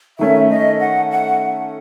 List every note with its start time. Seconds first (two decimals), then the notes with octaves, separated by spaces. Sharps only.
0.19 D#3 A3 C#4 E5
0.50 D#5
0.80 F#5
1.11 F#5